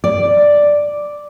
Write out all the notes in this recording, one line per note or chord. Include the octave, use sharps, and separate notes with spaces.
D5